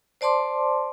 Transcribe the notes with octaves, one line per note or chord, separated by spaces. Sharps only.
C5 D5 A5 C6 D6